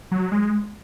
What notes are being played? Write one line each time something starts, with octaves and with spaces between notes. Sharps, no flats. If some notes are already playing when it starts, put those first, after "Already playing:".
F#3
G#3